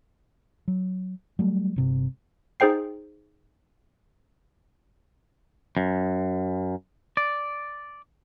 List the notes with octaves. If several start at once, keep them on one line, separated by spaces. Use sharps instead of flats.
F#3
F#3 G3 A3
G1 C3
D#4 G#4 C5 G5 C7
F#2
D5